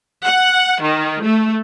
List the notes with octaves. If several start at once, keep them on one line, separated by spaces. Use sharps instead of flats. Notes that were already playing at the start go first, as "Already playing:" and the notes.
F#5
D#3
A3